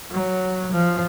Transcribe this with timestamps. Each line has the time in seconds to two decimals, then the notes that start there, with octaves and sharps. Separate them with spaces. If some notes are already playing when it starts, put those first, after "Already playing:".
0.11 F#3
0.72 F3